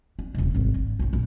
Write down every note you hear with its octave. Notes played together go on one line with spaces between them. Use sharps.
D4
D#1 C2
G#1 D#2
D3
B1 F#2
A#1 F#2